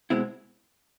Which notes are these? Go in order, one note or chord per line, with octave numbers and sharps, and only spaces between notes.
B2 G#3 C4 E4